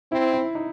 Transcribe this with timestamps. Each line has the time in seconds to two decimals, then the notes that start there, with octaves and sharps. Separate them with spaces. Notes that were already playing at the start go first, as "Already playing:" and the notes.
0.12 C4 E4
0.33 E4
0.55 D#4